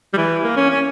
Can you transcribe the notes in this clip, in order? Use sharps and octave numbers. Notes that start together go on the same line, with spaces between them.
G3
E3
A#3
C#4
C#4